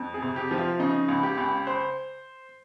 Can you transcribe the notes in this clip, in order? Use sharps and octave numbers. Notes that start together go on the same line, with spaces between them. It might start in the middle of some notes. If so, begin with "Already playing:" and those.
Already playing: F2
G#4
C3
G4
F3
F4
C#3 D#4
C#2
G4
C#2
C5